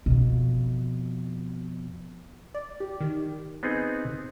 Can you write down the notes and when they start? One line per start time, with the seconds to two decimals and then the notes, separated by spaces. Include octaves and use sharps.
0.06 F2 B2
2.55 D5
2.80 G4
3.01 D#3
3.63 B3 C4 D#4 G#4